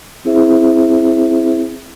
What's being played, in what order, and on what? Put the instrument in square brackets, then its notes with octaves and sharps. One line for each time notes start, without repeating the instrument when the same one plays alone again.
[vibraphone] C4 E4 G#4 C5 E5